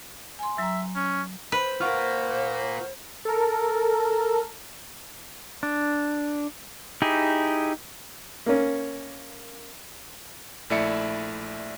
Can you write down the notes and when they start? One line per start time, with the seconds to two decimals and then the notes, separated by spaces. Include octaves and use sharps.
0.39 G#5 C6
0.58 F#3 E5 A#5
0.96 C#4
1.52 B4 C5
1.81 F4 A#4 F#5 C#6 F6
3.25 A4 A#4
5.63 D4
7.02 D#4 E4 G4 G#4
8.46 A#3 C#4
10.70 A#1 A3 E4 D5 E5 C#7